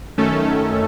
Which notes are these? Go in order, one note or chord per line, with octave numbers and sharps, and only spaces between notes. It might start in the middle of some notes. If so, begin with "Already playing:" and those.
F#2 D#3 A3 C#4 A4